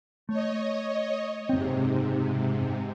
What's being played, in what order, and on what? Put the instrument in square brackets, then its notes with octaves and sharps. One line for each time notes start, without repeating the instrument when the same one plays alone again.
[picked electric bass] A3 [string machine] C#5 D#5
[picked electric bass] F#1 C4 [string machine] G#2 C3